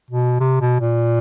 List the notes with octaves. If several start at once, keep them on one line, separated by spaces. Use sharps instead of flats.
B2
C3
B2
A#2